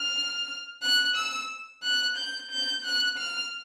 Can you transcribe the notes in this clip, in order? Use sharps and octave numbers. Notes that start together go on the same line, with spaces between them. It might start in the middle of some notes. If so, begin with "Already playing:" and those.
Already playing: F6
F#6
E6
F#6
G6
G6
F#6
F6